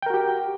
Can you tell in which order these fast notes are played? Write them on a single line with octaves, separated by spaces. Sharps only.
G5 A#4 F#4 G4